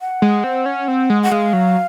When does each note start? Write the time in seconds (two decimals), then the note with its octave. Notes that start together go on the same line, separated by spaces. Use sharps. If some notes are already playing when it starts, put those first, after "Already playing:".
0.01 F#5
0.22 G#3
0.44 C4
0.66 C#4
0.88 C4
1.10 G#3
1.23 F#5
1.31 G#3 F5
1.53 F#3